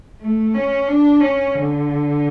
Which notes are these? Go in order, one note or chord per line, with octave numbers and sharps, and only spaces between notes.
A3
C#4
D4
C#4
D3